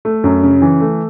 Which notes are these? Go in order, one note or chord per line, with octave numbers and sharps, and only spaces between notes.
A3
F#2
C#3
E3
A3